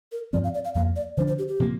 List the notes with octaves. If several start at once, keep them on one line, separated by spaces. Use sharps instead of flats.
A#4
G2 F3 C4 D5
F5
D5
F5
F2 F3 A#3 F5
D5
D3 F3 D4 C5
C5
G4
G4
C3 F3 A#3